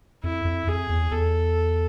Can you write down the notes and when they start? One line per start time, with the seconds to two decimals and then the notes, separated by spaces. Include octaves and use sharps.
0.24 F2 E4
0.45 F2
0.67 F2 G#4
0.89 E2
1.11 E2 A4